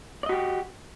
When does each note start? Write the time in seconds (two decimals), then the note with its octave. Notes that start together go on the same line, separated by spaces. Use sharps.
0.23 D5
0.26 D#5
0.29 F#4
0.32 G4